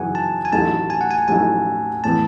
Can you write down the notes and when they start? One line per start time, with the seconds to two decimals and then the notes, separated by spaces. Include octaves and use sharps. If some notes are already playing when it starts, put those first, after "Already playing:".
Already playing: F#2 C#3 E3 B3 D#4 F#5 G#5
0.15 A5
0.45 G#5
0.52 A1 A2 F#3 A3 D#4 A5
0.90 G#5
1.01 F#5
1.11 G#5
1.28 A1 A2 F#3 A3 D#4 G#5
2.04 A2 E3 B3 A5